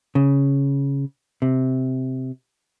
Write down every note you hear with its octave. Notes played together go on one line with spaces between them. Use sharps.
C#3
C3